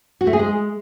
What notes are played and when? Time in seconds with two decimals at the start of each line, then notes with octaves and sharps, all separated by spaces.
0.21 F#4
0.27 A3
0.33 G#4
0.39 G#3